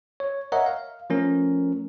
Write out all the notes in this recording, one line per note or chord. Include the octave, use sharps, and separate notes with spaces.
C#5
A#4 C#5 D#5 E5 F#5 A#5
F5
F3 A3 C#4 A#4